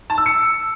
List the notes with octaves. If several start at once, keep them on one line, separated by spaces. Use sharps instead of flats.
A5
E6
C#7